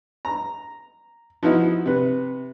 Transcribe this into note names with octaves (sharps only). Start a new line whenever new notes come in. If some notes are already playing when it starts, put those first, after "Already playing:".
A#5
F3 B3 D#4 E4 F#4
C3 B4